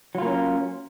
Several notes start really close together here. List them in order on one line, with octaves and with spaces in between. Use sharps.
F#3 F4 A#3 C#4